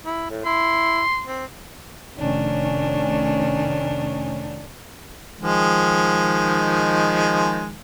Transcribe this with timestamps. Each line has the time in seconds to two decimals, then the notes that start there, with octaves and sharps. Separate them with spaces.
0.05 E4
0.31 A2
0.45 E4 C6
1.27 C4
2.16 F1 D#3 C#4 D4
5.41 D#3 F3 G#3